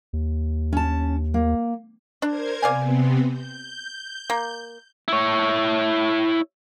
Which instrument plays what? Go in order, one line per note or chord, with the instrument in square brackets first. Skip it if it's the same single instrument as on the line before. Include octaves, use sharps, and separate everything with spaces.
[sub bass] D#2
[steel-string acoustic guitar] C#4 A5
A#3
[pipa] D4 [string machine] A#4 C5 G#6
[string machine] C3 B3 C4 [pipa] D5 F5 G#5
[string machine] G6
[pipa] A#3
[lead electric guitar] E4 C#5